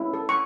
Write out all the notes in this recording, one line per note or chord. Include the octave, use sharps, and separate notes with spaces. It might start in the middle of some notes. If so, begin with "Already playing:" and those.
Already playing: C#4 E4
A4
C#6